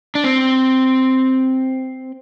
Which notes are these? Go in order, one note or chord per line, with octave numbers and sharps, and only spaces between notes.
D4
C4